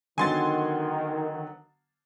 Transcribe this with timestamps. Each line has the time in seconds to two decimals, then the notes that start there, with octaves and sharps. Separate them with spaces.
0.18 D3 D#3 F#3 B3 G#5 C6 A6